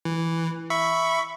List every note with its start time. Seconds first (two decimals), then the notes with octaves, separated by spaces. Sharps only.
0.05 E3
0.70 E5 B5 C#6